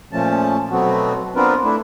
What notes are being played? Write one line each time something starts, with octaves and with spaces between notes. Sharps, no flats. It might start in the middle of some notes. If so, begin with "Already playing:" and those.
A#2 F3 A3 C#4 A5
B2 F#3 A3 B3 C4 F#4
B3 C4 D4 F4 A#4 B4
A3 D4 E4